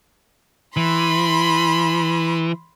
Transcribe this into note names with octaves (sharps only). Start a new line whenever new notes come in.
E3 B5 C6